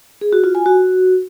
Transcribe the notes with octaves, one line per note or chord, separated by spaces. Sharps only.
G#4
F#4
F4
G#5
F#4